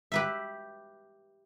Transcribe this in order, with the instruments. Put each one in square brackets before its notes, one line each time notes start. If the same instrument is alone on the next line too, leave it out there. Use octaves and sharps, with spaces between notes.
[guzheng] G4 B4 E5